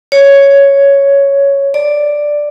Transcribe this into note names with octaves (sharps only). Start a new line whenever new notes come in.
C#5
D5